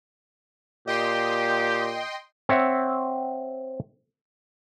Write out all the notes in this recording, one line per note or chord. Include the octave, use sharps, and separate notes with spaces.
A#2 G4 D#5 G5 C6
C4 C#5 E5 F#5